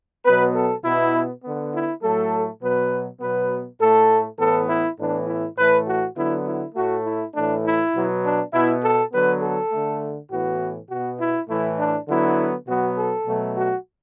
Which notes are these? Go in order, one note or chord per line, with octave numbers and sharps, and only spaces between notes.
B2 F#3 B3 B4
A4
B2 B3 E4
D3 B3
E4
A2 F#3 A3 A4
B2 F#3 B3 B4
B2 F#3 B3 B4
A2 A3 A4
A2 E3 B3 A4
E4
A2 E3 B3 D4
E4
A2 E3 A3 B4
F#4
D3 F#3 B3 E4
E4
A2 A3 F#4
E4
A2 E3 A3 D4
E4
B2 F#3 B3
D4
B2 B3 E4
A4
D3 F#3 B3 B4
A4
D3 A3
A2 E3 B3 F#4
B2 B3 F#4
E4
A2 E3 A3 E4
D4
D3 F#3 B3 E4
B2 F#3 B3 F#4
A4
B2 F#3 A3
F#4